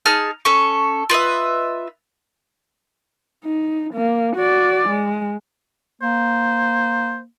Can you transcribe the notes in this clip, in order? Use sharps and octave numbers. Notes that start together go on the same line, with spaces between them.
D#4 G#4 A5 F6
C#4 A4 C#6
F4 B4 D#5 E5
D#4
A#3
F#4 D5
G#3
A#3 C5